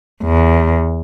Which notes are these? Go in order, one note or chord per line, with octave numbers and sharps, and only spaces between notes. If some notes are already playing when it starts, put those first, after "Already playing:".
E2